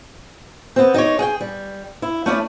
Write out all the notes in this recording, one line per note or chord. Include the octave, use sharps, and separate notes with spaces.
B3 C4
D#4 G4 C#5
G#4 F#5 G5
G3
E4
A3 C#4 E4 D5